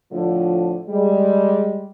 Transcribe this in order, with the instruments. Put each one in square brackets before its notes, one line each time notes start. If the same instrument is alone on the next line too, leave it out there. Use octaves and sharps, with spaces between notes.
[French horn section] A2 D3 F3
G3 G#3